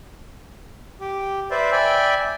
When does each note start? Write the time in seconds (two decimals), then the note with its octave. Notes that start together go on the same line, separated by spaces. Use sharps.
1.00 G4
1.51 B4 C5 D5 E5
1.72 D5 E5 G5 G#5 B5